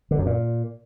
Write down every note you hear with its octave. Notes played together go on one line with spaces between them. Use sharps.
D3
F#2
A#2